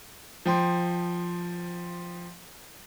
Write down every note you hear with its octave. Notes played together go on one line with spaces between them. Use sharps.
F3 G5 C6